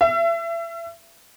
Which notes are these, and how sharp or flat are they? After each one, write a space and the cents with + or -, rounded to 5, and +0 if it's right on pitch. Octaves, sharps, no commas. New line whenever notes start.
E5 +30